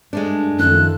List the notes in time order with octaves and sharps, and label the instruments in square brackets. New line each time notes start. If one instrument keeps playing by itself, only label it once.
[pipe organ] G2 [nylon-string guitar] G#3 A3 D4
[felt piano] F#2 A3 [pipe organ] D#3 F3 [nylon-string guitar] A4 [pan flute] F#6